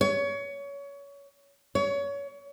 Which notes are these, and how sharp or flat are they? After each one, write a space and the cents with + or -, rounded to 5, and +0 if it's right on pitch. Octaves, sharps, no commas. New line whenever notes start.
C#5 +25
C#5 +25